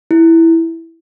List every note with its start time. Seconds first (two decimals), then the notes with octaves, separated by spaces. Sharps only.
0.11 E4